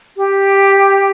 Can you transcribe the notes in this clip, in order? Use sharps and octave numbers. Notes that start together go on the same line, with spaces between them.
G4